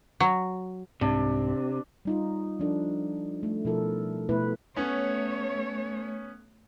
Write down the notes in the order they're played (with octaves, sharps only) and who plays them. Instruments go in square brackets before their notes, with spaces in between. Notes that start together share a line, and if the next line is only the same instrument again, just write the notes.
[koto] F#3
[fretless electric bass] C2 G#2 [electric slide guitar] C3 [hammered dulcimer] D4
[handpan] G3 D#4 F4
F3 D4 A4
A3
B2 F3 E4 A4 A#4
B2 A3 B3 E4 B4
[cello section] A3 C#5 [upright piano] B3 C#4